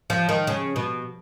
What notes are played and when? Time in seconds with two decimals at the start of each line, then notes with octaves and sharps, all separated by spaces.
0.10 F3
0.29 D#3
0.47 C#3
0.76 B2